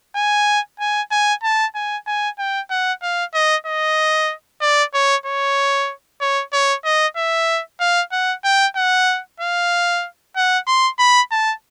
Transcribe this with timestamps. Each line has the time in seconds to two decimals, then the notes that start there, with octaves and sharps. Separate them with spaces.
0.16 G#5
0.80 G#5
1.11 G#5
1.43 A5
1.75 G#5
2.07 G#5
2.38 G5
2.70 F#5
3.02 F5
3.34 D#5
3.66 D#5
4.61 D5
4.94 C#5
5.26 C#5
6.21 C#5
6.53 C#5
6.85 D#5
7.17 E5
7.80 F5
8.12 F#5
8.44 G5
8.76 F#5
9.40 F5
10.36 F#5
10.67 C6
10.99 B5
11.31 A5